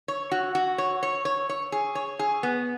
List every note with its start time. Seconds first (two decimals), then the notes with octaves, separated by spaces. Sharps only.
0.08 C#5
0.32 F#4
0.55 F#4
0.78 C#5
1.03 C#5
1.25 C#5
1.49 C#5
1.72 G#4
1.95 C#5
2.19 G#4
2.43 B3